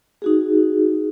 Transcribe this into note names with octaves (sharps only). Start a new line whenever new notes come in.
D#4 F#4 G#4